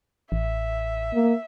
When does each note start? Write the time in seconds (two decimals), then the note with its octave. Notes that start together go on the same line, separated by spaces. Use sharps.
0.32 A1 E5
1.14 A#3